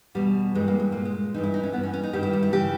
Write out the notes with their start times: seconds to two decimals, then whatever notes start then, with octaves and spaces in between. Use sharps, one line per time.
0.15 E2 B2 G3
0.55 G2 E3 G#3
0.68 A#3
0.80 G#3
0.92 A#2 A#3
1.05 G#3
1.34 G2 E3 D#4
1.44 E4
1.54 D#4
1.63 C#4
1.73 E3 B3
1.77 G2
1.83 C#4
1.94 C#4
2.03 D#4
2.13 G2 D#3 G4
2.23 E4
2.33 G3
2.43 E4
2.53 C#3 E3 G4